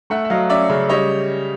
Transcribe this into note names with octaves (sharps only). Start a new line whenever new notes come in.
A3 E5 F#5
E5
F#3 D#5 F5
C#4 D5 E5
C#3
G3 C#5 D#5